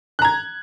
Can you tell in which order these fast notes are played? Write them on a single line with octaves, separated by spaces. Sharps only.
F#6 A#5 G#6